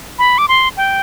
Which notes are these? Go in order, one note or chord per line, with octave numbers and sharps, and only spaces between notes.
B5
D6
C6
G5